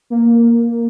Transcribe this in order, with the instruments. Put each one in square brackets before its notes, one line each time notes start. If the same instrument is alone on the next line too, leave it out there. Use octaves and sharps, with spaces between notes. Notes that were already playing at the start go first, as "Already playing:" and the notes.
[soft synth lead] A#3